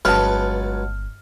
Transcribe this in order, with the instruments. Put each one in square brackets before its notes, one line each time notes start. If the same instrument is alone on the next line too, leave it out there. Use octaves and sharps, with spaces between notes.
[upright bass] G1 [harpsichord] C#2 F#3 B4 [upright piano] A5 F6